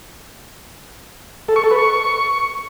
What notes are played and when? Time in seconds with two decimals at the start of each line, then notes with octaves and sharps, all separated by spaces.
1.48 A4
1.56 C#6
1.64 A4
1.71 B4
1.79 C#6